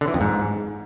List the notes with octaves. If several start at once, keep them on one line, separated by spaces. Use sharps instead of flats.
D3
E3
F2
G#2